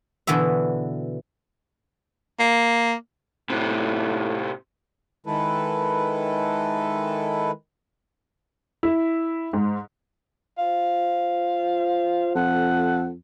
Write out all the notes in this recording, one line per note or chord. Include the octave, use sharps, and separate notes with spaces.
B2 D3 E3 B3 E5
A#3
A2 C3 F#3
D#3 G#3 E4 A4 B4
E4
G#2
F4 C5 F5
F2 A4 F#5